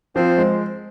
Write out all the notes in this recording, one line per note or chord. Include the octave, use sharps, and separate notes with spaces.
F3 C4 C5
G#3